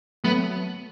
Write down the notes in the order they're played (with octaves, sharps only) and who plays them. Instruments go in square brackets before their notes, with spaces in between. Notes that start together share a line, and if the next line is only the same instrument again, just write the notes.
[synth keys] F#3 A3 [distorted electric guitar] B3